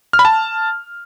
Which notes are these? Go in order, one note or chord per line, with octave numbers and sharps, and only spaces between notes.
F6
B5
A5